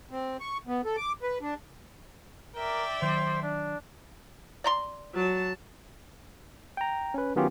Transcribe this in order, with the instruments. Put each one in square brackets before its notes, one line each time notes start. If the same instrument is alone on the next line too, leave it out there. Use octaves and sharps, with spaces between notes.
[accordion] C4
C#6
B3
A4
D6
B4
D4
[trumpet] A#4 [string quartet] D5 E5 G5
[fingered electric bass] D#3 F#3 [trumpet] C5
[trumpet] D4
[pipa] D5 A#5 C6
[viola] F#3 A5
[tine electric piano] G5 A#5
C#4 B4
D#3 F#3 B3 C#4 F4 G4